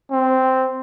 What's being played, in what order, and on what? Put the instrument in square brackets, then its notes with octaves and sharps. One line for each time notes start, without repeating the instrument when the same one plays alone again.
[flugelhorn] C4